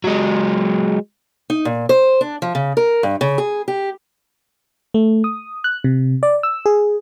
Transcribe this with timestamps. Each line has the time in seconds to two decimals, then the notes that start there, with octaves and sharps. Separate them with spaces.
0.04 F#3 G#3
1.50 D#4
1.65 A#2
1.89 C5
2.21 D4
2.42 F3
2.55 C#3
2.77 A#4
3.03 G2
3.21 C#3
3.38 G#4
3.68 G4
4.94 A3
5.24 D#6
5.64 F#6
5.84 C3
6.23 D5
6.43 E6
6.66 G#4